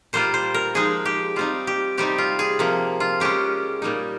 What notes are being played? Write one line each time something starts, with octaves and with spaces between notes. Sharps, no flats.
A#2 G3 A#3 F4 C5
C5
A#4
F3 G#3 D#4 G#4
G4
G3 C4 D#4 F4
G4
C3 G3 C4 D#4 G4
F4
G#4
C3 F3 A#3
F4
C#3 G#3 C#4 G4
A#2 G3 A#3 D#4